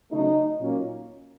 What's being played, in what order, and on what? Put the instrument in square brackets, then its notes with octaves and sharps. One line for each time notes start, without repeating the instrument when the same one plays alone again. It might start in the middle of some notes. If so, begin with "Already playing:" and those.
[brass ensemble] C#3 F#3 A3 D#4
A#2 F#3 A#3 C#4